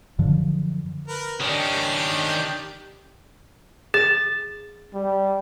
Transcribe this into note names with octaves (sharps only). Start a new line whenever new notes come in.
F#2 D3 F3
A#4 B4
D#3 C#4 D4 G4 G5
G#4 A6
G3